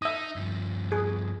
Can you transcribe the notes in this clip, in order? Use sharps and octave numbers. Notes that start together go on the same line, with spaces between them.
D#4 E5 D#6
G2 F3
G#4